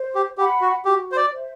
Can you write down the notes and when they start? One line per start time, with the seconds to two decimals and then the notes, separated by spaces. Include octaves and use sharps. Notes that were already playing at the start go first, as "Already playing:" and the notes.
Already playing: C5
0.15 G4
0.38 G4 F#5 B5
0.61 F#4
0.84 F#4 G4
1.12 C5
1.17 D5
1.32 C5 E5